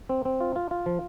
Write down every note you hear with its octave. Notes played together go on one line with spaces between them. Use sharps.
C4
C4
F4
F4
F4
F3